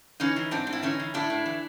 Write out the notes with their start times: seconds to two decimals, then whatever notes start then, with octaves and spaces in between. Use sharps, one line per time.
0.20 E3 C#4 D#4
0.36 E3
0.51 G#2 C4 D4
0.67 G#2
0.73 E4
0.83 E3 C#4 D#4
0.99 E3
1.14 A2 D4 E4
1.30 A2
1.46 E3